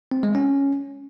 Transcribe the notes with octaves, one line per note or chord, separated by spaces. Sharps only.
C4
G#3
C#4